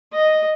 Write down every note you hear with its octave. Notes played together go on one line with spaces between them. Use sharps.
D#5